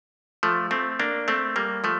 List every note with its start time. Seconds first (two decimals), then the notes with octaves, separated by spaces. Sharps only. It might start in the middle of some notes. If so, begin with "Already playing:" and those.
0.43 F3 A3
0.71 A3 C4
1.00 A#3 D4
1.28 A3 C4
1.56 G3 A#3
1.84 F3 A3